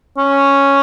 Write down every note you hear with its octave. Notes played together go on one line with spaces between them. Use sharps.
C#4